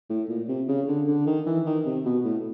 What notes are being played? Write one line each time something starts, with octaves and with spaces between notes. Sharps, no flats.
A2
A#2
C3
C#3
D3
D3
D#3
E3
D#3
C3
B2
A2